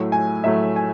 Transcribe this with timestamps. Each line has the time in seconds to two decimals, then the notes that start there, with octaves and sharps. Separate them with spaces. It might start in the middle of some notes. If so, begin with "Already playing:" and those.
Already playing: A2 F#3 A3
0.12 G#5
0.44 A2 F#3 A3 E5
0.76 G#5